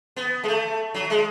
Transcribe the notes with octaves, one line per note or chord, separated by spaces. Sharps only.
B3
G#3
A3
F#3
G#3